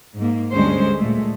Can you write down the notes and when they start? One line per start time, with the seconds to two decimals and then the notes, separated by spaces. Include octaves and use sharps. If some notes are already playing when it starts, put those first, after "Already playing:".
0.16 G#2 A#3
0.53 D2 G2 G3 G#3 C#4 C5
0.98 A#2 G#3 A3